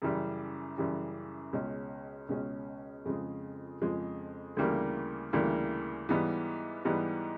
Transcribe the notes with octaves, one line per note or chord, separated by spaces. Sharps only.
F#2 C#3 E3 G3
F#2 C#3 E3 G3
C#2 B2 G#3 C#4
C#2 B2 G#3 C#4
F2 C#3 F3 G#3
F2 C#3 F3 G#3
D2 C#3 E3 G3 A#3
D2 C#3 E3 G3 A#3
G#2 E3 G3 B3
G#2 E3 G3 B3